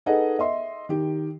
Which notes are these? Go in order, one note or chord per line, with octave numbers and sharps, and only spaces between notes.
D#4 G#4 A4 B4 D#5 F#5
D#5 E5 C6
D#3 G4